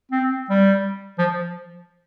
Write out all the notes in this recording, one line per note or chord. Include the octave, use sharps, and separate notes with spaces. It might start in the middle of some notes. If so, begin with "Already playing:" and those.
C4
G3
F3